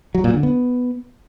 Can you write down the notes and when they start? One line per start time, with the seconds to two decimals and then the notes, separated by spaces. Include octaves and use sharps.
0.15 F#3
0.24 A#2
0.34 D3
0.43 B3